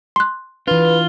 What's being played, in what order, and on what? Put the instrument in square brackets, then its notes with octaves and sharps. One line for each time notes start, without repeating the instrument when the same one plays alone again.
[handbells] C6 F#6
[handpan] E3 D4 [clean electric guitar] F4 [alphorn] B4